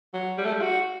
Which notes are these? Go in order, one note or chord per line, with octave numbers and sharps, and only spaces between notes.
F#3
G3
A3
G3
F#4